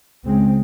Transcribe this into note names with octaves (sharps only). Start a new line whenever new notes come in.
C#2 C#3 G#3 C4